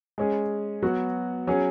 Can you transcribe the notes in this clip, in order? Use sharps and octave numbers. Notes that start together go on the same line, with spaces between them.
G#3 C#4 G#4
F#3 B3 F#4
F#3 C#4 G#4